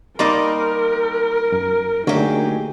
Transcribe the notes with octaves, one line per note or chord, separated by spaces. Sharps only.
G3 A#3 D#4 A#4 C6 D6
F#2
D3 F#3 A3 A#3 D#4 G4 G#4